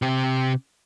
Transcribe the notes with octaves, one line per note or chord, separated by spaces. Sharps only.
C3 G4